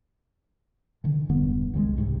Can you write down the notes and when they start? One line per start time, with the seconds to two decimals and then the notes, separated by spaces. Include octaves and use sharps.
1.04 D3 E3
1.29 E1 G2 D3 B3
1.73 C2 D#3 F#3 G#3
1.96 C2 G#2 C3